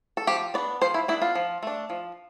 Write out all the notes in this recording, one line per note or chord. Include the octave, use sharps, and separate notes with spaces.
A4
F3 G4
B3 D4 D5
F3 C5
E4
B3 D4 E4
F4
F3
A3 D4
F3